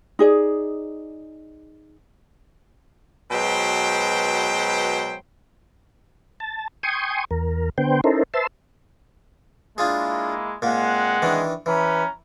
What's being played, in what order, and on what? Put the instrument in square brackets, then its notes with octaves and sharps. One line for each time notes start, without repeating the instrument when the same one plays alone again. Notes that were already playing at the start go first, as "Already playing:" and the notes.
[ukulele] D#4 G#4 D5
[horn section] B2 F#3 G#3 B4 C5 G5
[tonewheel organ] A5
G5 G#5 C6 C#6 D#6
E2 A#4
D3 B3 C5 G5
C#4 D#4 E4 A4 A#4 C5
B4 C5 E5 A5 C6 E6
[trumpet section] G#3 A#3 E4 [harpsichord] D4 F4 G#4
[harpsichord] A#2 A#3 [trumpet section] G#3 C4 F#5
[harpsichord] D#3 E3 D4
[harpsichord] E3 [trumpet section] C#4 B4 A#5